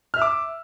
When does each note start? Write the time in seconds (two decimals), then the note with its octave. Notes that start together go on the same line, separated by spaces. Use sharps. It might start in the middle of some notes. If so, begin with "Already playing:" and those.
0.14 F6
0.16 E5
0.19 E6
0.22 D6